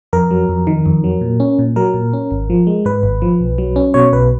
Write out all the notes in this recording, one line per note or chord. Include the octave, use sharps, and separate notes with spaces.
F2 A#4
F#3
F2
D#3
F2
F#3
A#2
C#4
A#2
F#3 A#4
A#2
C#4
G#1
F3
G#3
G#2 B4
G#1
F3
B1
F#3
C#4
B2 C#5
B1 B4